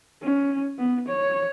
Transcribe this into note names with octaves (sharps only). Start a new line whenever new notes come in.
C#4
B3
C#5